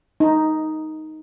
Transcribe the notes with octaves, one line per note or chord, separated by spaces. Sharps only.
D#4